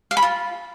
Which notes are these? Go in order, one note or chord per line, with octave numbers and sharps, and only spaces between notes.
F5
B5
F4